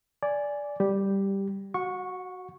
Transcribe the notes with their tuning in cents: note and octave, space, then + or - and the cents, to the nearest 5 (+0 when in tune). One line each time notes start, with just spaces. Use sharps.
D5 -10 G#5 +0
G3 +0 G4 +0
F#4 +0 F#5 -35 C#6 -5